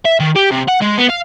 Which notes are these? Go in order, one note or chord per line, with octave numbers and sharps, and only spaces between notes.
E5
D#3
G4
C3
F#5
G#3
B3
F5